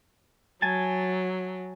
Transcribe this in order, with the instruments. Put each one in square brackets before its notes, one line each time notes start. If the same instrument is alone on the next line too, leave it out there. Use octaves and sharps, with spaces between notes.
[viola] F#3 [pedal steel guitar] G#5 A5